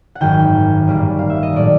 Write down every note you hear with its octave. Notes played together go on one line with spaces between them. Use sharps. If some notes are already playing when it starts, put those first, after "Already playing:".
F#5
G#1 F#2 D#3 G5
A1 G2 D#3 G3 A#3
F5
E5
D#5
A#1 A2 F#3 A3 D5